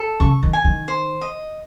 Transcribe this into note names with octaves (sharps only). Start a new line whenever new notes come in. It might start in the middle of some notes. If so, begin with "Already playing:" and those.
Already playing: A4
C#3 C#6
D#3
G#5
D#3
C5
D#5